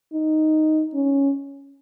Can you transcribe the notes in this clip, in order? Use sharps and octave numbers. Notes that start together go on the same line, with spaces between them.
D#4
C#4